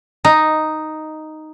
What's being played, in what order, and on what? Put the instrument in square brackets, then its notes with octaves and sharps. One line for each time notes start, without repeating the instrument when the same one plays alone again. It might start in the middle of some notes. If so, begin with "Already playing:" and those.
[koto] D#4